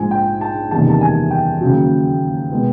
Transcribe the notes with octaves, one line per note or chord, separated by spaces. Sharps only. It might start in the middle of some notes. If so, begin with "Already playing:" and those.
Already playing: A#1 G#2 F3 G#5
G5
A5
F#1 E2 C3 D#3 G3 A5
A5
G#5
G5
D#2 C#3 F#3
B2 G#3 B3